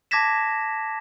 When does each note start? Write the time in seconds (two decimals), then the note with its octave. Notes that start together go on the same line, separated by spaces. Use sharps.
0.11 A5 D6 G#6 A#6 B6 E7